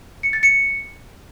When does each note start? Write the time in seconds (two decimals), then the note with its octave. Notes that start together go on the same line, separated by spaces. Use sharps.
0.23 C#7
0.33 A6
0.43 C#7